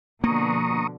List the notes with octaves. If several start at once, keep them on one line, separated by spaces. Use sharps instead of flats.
B2 D3 F3 A#3 A#5 C#6 D#6